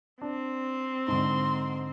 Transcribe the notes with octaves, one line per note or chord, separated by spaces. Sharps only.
C4 D4
G#2 D3 C6